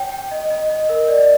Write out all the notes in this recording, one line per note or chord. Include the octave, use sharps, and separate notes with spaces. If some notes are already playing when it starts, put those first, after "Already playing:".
Already playing: C#5 G5
G5
D#5
D#5
D#5
A#4
D5